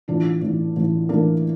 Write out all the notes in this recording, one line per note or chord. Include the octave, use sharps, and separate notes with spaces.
A1 A2 E3 D4 F4
A1 A2 E3
A1 A2 E3
A1 A2 E3 A#3 D4